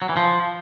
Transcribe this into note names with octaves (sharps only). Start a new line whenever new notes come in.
F#3
E3
F3